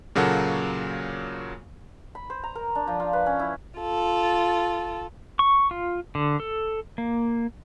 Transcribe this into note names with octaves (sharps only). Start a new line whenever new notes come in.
A#2 C#3 F#3 A#3 F#4 A4
B5
C5
A#5
A#4
D4
F3
F4
B4
C#4
E4
F4 A4
C#6
F4
D3
A4
A#3